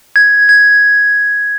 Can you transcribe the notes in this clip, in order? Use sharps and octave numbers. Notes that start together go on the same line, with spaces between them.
G#6
G#6